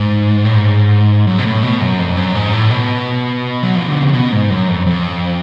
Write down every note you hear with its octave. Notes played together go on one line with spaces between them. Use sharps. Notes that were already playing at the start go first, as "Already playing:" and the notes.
Already playing: G#2
A2
G#2
F#2
B2
A2
B2
F#2
F2
F#2
G#2
A2
B2
F#3
F3
D3
C#3
B2
G#2
F#2
F2
F2